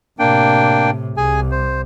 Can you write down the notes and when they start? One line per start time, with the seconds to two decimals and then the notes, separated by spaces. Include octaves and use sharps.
0.19 A2 C3 A#3 D4 G5
1.17 C2 G#4 G#5
1.51 C5